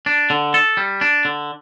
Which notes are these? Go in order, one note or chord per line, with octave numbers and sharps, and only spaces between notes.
D4
D3
A4
G3
D4
D3